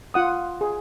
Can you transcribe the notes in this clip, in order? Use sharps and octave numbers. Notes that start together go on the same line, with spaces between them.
F4 F#5 D#6
G#4